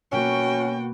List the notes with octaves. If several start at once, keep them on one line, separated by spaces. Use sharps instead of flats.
B2 A#3 B3 C#4 F#4 G5